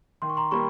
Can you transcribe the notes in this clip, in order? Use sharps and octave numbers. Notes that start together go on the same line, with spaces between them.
D#3 C6
C#6
A#5 C6
G3 A#3 B5 C#6